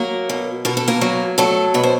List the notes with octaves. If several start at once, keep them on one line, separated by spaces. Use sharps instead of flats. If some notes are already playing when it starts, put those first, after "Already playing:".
Already playing: F#3 A#3 A#4
B2
B2 A#4
A4
A#3 A#4
F#3
F#3 A3 A4
B2 B4
C5